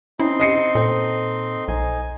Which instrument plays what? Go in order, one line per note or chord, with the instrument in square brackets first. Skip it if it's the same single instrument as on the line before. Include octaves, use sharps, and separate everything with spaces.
[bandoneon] C4 D#4 C6 [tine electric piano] C#4 [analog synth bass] E4
[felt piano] D#5 C7 C#7
[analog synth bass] A#2 [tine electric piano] A4 C5
[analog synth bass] B1 [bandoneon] D#4 G#5